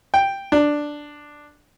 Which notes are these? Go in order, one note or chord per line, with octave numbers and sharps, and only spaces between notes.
G5
D4